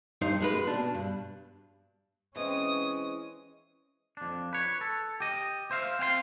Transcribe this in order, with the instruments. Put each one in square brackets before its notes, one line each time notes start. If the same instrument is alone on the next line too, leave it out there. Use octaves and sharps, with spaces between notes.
[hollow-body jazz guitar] G2 D#4 C5
F#2 G#3 B4
B2 D4
G2
[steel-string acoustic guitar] E3 G#3 C4 [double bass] C#4 [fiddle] D#6
[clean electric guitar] F2 D4
B4 C#5
A4
G4 D#5
C5 E5 F5
C4 F5 G5 C6